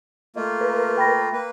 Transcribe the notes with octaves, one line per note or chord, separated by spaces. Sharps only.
A3 A#3 F4 D#5
A#4 B4
G5 B5 A#6
A#3 B4